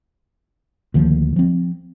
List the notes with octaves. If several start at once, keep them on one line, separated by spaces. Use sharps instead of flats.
D2 D#3 F3 A#3
F3 C4